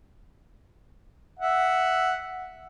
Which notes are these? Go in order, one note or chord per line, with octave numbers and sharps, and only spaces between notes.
E5 F#5